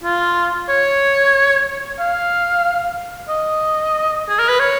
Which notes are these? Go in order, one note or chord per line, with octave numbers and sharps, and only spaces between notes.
F4
C#5
F5
D#5
G#4
A#4
B4
C#5